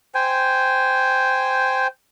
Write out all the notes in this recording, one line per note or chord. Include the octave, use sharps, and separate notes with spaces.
C5 G5 G#5